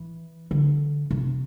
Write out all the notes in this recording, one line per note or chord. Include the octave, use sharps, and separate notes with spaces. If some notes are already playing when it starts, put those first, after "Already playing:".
Already playing: E3
D3
C3